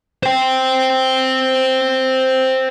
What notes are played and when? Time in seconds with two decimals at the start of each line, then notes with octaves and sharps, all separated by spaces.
0.23 C5 G5